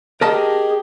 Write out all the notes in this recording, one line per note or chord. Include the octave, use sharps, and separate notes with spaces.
G4 G#4 A#4 D#5 A5